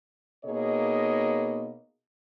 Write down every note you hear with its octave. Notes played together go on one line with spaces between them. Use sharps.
B2 A#3 D#4 G#4 C#5 D#5